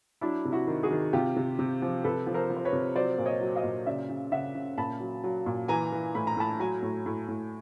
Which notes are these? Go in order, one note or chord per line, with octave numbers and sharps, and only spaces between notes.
F#3 D4 E4
C3
E4 F#4
D#3
F#4 G#4
D#3
C3 F4 G4
C3
C3
F3
C3 A4 B4
F3
A#4 C5
F3
C5
B4 C#5
C3
F#3 C5 D5
A#2
C#5 D#5
F#3
D#5 F5
A#2
C#3 D5 E5
C#3
C#3 E5 F#5
C#3
A#2 A5 B5
F#3
F#3
A#2
E3 G#5 A#5
E3
A2 B5
A#5
A2 A5 B5
F#3 G#5 A#5
A2
A2
A2